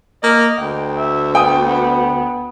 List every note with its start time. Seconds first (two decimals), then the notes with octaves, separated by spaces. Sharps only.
0.23 A#3 D#5
0.60 D2 G5
0.97 E5
1.35 B3 G5 D#6
1.65 B3